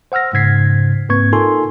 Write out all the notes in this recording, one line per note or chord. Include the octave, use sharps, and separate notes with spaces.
C5 F#5 E6 F6 A#6
G#2 C#3 C5 G#6 B6 C7
G#2 A#3 C4 B4 C#6 G#6
D#4 F4 A4 A#4 G#5 C6